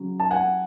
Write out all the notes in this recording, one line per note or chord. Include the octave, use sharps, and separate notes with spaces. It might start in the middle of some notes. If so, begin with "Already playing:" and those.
Already playing: C#3 F#3
A5
F#5 G#5